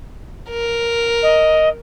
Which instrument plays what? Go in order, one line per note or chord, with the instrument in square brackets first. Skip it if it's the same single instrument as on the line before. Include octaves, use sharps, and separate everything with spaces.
[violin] A#4
[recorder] D#5